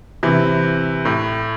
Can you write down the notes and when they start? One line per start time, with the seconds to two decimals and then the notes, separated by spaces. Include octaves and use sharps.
0.23 C3 E3
1.05 A2